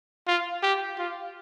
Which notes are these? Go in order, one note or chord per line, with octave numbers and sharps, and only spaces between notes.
F4
G4
F4